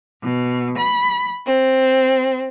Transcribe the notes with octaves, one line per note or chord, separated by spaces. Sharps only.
B2
B5
C4